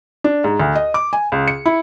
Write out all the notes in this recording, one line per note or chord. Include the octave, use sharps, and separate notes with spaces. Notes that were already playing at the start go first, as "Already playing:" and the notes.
D4
G#2
D2
D#5
D6
G#5
C#2
C#7
E4